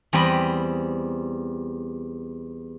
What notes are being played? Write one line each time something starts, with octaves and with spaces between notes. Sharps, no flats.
E2 G3 C4 D#5 B5